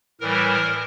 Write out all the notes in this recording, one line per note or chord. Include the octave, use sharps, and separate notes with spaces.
A2 E3 G3 A#4